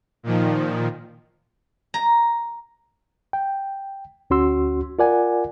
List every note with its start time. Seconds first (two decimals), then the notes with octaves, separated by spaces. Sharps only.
0.23 A#2 D#3 F3
1.94 A#5
3.33 G5
4.30 D2 C#4 F#4 C6 E6
4.99 F4 A#4 D5 F#5 G#5